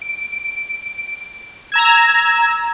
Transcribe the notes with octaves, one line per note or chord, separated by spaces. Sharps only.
D7
A#5 E6 G#6